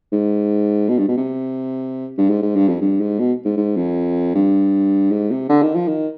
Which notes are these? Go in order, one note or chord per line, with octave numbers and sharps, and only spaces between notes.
G#2
B2
G2
B2
C3
G2
G#2
G#2
G2
F2
G2
G#2
B2
G#2
G#2
F2
G2
G#2
C3
D3
D#3
F3
D#3